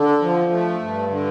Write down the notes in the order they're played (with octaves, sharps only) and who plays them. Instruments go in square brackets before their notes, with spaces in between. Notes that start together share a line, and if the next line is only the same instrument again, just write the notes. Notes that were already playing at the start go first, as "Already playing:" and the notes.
Already playing: [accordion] D3
F3
A3
G2
D3